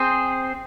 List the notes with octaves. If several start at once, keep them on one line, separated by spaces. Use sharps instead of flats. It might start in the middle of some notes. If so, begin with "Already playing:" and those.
Already playing: C4 G#4 C5